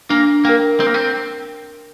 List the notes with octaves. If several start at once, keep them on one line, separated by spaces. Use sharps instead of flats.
A#3 D4
A#3 A#4 G5
C4 A#4
A#3
C4